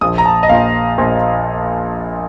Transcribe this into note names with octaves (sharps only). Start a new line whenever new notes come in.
A#1 A#2 F3 D#6
A#5
A5
D#5
A#1 A#2 F3 F5
A#1 A#2 F3